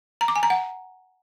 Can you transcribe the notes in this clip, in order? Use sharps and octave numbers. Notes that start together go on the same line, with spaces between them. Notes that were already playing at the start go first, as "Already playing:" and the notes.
A#5
D6
G#5
A#5
F#5